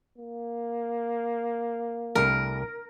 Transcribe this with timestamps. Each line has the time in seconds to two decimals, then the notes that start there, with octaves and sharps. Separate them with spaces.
0.18 A#3
2.15 C2 G3 A3 A#4